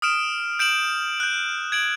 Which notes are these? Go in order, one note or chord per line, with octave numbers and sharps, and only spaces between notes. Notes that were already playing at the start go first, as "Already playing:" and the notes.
D#6 F6 D7 E7
G6 D7 E7 F#7
F#6 G6
G#6 D7 F#7